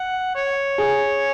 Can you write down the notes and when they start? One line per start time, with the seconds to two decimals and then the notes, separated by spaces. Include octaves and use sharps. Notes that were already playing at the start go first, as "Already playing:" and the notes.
Already playing: F#5
0.35 C#5
0.78 G#4